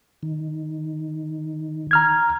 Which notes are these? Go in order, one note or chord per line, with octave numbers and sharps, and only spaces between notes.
D#3
A#5 F6 G#6